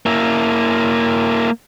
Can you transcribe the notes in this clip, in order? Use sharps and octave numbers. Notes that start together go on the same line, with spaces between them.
A#3 E4